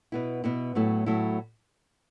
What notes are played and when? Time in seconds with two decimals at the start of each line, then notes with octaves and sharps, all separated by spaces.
0.12 B2 B3 E4
0.44 B2 B3 E4
0.75 A2 F#3 A3 E4
1.06 A2 F#3 A3 E4